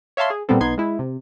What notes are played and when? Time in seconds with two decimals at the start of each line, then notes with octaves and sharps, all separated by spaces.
0.17 C#5 E5 F5 A5 C6
0.30 G#4
0.49 A#2 G3 B3 C4 A4
0.60 B1 B3 D#4 C6 G#6
0.78 G#3 E4
0.99 C3